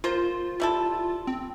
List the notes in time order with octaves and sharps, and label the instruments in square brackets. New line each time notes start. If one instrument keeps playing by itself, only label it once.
[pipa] A#3 C5 [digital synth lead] F4
[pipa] G3 E4 A4
[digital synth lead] C4